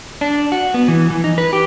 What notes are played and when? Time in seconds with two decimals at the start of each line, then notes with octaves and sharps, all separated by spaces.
0.21 D4
0.52 F#4
0.74 B3
0.88 E3
1.10 E3
1.24 D#4
1.38 B4
1.53 G4